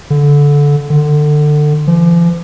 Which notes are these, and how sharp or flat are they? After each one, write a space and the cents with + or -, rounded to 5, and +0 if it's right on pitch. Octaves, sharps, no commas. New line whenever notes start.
D3 -20
D3 +25
F3 -45